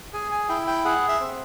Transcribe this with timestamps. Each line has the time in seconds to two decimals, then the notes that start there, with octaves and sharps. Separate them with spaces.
0.14 G#4 G#5
0.31 G#5
0.49 E4 G5
0.67 G5
0.85 G#4 F#5
1.09 E5
1.20 C4